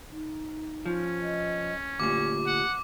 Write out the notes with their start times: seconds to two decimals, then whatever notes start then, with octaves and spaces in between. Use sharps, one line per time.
0.11 D#4
0.86 F3 C#4
1.22 D#5
2.00 D2 A#2 G4 D6
2.47 F#5